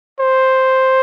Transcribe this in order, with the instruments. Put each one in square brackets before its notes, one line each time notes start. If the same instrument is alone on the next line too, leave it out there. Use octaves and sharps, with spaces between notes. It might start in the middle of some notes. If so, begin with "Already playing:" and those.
[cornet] C5